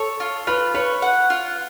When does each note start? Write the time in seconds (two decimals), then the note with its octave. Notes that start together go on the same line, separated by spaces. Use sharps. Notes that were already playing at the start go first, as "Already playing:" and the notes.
Already playing: A4 C#5
0.20 F4
0.47 F4 B4
0.74 B4 C#5
1.02 F#5
1.30 F4